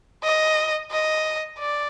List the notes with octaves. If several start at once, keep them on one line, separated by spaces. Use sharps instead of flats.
D#5
D#5
D5